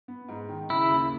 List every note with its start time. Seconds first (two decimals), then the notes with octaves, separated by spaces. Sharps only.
0.08 B3
0.29 G#2
0.49 D#3
0.70 C#3 E4
0.90 D#2